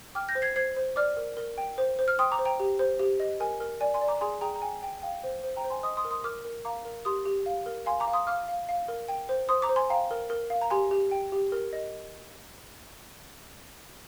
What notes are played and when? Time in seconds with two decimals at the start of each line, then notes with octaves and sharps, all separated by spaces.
0.15 G5 D6 F6
0.29 G6 A#6
0.35 C5
0.42 G#6 C7
0.56 C5 G#6 C7
0.76 C5
0.96 D5 D6 F6
1.17 A#4
1.37 A#4
1.58 G5
1.78 C5
1.99 C5
2.08 F6
2.19 G5 C6 D#6
2.32 A#5 D6
2.39 C5
2.45 G5 A#5
2.60 G4
2.79 C5
2.99 G4
3.20 D#5
3.40 A#4 G#5
3.60 A#4
3.81 D5 G#5
3.94 G#5 C6
4.01 D5
4.08 A#5 D6
4.21 G#4 G#5 C6
4.41 G#4 G5 A#5
4.55 A#5
4.62 G5 G#5
4.83 G5
5.02 F5 G5
5.24 C5
5.43 C5
5.56 G5 A#5
5.64 C5
5.70 G#5 C6
5.83 D#5 C6 D#6
5.97 C6 D#6
6.05 A#4
6.11 C6 D#6
6.24 A#4 D6 F6
6.45 A#4
6.65 F5 A#5 D6
6.85 A#4
7.05 G4 C6 D#6
7.25 G4
7.46 F5
7.66 A#4
7.86 F5 G#5 C6
8.00 A#5 D6
8.08 F5
8.13 C6 D#6
8.27 F5 D6 F6
8.48 F5
8.69 F5
8.88 A#4
9.08 G5
9.29 C5
9.49 C5 C6 D#6
9.62 A#5 D6
9.69 C5
9.76 G#5 C6
9.90 F5 G5 A#5
10.11 A#4
10.30 A#4
10.50 F5
10.62 A#5
10.70 G4 G#5 C6
10.91 G4
11.11 G5
11.32 G4
11.52 A#4
11.73 D#5